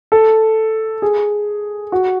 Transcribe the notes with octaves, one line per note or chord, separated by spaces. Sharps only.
A4
G#4
F#4